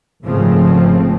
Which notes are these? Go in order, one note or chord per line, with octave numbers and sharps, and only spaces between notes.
G#1 G#2 C#3 F3 A3 C4